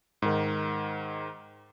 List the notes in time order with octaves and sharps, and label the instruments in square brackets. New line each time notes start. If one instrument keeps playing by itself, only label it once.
[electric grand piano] G#2 D#3